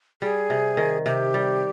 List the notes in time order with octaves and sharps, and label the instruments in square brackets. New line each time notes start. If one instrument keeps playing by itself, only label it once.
[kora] G3 [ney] G#4
[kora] C3
D#3
[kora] C3 [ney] G4
[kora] G3